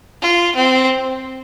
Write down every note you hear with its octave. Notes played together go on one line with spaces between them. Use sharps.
F4
C4